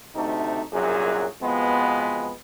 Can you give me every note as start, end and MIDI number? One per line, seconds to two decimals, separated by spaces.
0.15 0.61 38
0.15 0.61 48
0.15 0.61 57
0.15 0.61 63
0.72 1.25 36
0.72 1.25 42
0.72 1.25 46
0.72 1.25 54
0.72 1.25 68
1.42 2.31 41
1.42 2.31 47
1.42 2.31 56
1.42 2.31 59